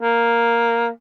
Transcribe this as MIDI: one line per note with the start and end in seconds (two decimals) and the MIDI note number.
0.01 0.88 58